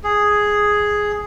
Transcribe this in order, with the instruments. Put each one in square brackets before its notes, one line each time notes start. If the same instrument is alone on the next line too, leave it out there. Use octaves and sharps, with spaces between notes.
[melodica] G#4